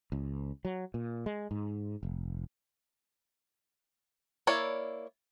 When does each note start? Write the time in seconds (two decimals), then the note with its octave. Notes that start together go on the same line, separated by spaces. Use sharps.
0.12 C#2
0.65 F#3
0.94 A#2
1.26 G#3
1.51 G#2
2.03 F1
4.47 A#3 E4 C#5 D5